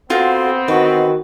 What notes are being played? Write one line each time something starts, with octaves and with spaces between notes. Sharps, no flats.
B3 C4 F4 F#4 A4
D#3 F#4 B4 D#5